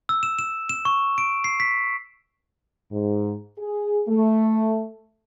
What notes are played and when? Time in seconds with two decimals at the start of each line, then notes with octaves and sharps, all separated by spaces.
0.09 E6
0.23 E7
0.39 E7
0.69 E7
0.85 C#6
1.18 D7
1.44 C7
1.60 B6
2.92 G#2
3.58 G#4
4.08 A3